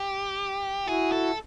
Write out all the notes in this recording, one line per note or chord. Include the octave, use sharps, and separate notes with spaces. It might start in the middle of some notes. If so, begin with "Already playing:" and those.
Already playing: G4
E4 F#4 G#4
A4